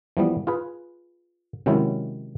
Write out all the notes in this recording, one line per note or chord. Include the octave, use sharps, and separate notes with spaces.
E3 F3 G3 B3
F4 G#4 B4
C3 D#3 F#3 G#3 C#4 E4